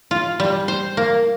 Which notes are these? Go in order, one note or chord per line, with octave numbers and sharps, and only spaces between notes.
F4
G3
C5
A#3